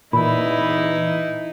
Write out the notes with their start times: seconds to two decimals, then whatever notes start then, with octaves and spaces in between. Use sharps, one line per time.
0.13 A#2 E3 D#4 E4 B5